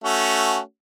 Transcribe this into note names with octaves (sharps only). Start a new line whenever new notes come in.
A3 C#4 F#4